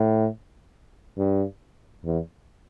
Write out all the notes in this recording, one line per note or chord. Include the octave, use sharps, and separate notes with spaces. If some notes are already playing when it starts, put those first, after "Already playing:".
Already playing: A2
G2
E2